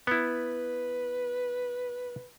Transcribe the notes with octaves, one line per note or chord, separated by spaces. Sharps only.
B3 E4 B4